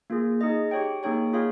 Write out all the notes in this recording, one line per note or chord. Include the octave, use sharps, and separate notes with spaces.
A#3 F4 G#4
D#4 G#4 D#5
G4 C#5 G5
A#3 D#4 G#4 C#5 G5
F4 G#4 C#5 F5